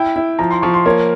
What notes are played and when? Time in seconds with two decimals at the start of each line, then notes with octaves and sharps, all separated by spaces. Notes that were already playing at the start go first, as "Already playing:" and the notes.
Already playing: E4 G5
0.16 E4
0.39 F3 A#5
0.51 C6
0.62 F3 C#6
0.74 C6
0.86 A#3 C#5